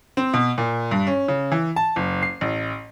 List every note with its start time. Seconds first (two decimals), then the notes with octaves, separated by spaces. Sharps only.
0.17 C4
0.34 B2
0.58 A#2
0.91 G2
1.07 C#4
1.28 C#3
1.52 E3
1.76 A5
1.96 F#1
2.23 C7
2.41 A1